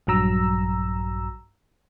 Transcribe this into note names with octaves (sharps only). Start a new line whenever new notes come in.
A#1 G2 F#3 A#5 E6